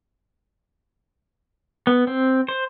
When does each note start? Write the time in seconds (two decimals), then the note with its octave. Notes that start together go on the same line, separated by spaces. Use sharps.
1.87 B3
2.07 C4
2.49 C5